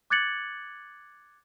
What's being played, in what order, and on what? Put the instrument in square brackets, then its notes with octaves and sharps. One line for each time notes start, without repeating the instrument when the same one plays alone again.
[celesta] D6 F#6 G#6 A6 C#7 F#7